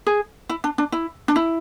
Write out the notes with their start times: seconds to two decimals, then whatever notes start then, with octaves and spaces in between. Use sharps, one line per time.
0.07 G#4
0.49 E4
0.64 D4
0.78 D4
0.92 E4
1.28 D4
1.36 E4